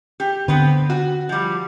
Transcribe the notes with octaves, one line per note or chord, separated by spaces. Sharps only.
G4
D3 B3 C4 B4
F#4
F3 G3